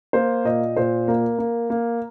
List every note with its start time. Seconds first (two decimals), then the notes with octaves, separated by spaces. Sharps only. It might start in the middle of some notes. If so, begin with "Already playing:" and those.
0.13 A#3 C5
0.45 A#2 D#5
0.77 A#2 C5
1.08 A#3 A#4
1.38 A#3
1.70 A#3